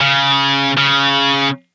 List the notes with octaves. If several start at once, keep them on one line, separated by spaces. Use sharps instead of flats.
C#3
C#3